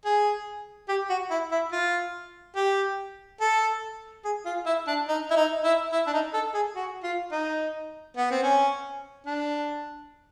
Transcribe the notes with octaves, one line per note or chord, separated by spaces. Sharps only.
G#4
G4
F#4
E4
E4
F4
G4
A4
G#4
F4
E4
D4
D#4
E4
D#4
E4
E4
D4
D#4
A4
G#4
F#4
F4
D#4
B3
C4
C#4
D4